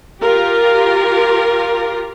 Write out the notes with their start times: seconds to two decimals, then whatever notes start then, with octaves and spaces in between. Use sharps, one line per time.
0.20 F4 G4 A#4